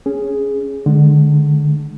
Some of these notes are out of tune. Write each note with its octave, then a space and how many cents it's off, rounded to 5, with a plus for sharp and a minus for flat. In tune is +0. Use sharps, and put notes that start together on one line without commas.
C#4 +0 G#4 +0
D3 +20 G#3 +30